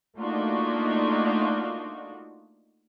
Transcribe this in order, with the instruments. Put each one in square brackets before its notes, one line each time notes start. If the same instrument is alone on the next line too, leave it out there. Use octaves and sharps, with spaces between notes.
[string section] A3 A#3 D4 D#4 F4 F#4